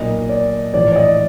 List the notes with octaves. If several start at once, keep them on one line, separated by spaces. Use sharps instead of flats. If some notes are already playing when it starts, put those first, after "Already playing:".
Already playing: B1 A#2 D#5
D5
A#1 A2 E3 D5
D5
D#5